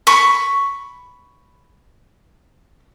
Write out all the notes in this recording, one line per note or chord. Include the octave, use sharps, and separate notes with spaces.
B5 C#6